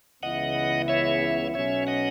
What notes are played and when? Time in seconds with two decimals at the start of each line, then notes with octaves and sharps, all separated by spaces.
0.23 C#2 C#3 E3 B3 E4 D#5 F#5
0.88 C#5 E5
1.54 B1 B2 F#3 C#4 C#5 E5
1.87 D#5 F#5